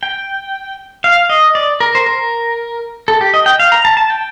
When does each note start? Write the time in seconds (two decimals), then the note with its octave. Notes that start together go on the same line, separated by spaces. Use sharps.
0.03 G5
1.04 F5
1.30 D#5
1.55 D5
1.80 A#4
1.95 C5
2.06 A#4
3.08 A4
3.21 G4
3.34 D#5
3.46 G5
3.59 F5
3.72 A#5
3.85 A5
3.97 A5
4.10 G5